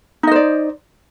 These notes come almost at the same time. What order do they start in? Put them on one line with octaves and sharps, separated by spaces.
D#4 D#5 C5 D5